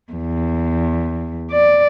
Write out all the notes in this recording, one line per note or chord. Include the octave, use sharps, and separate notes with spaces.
E2
D5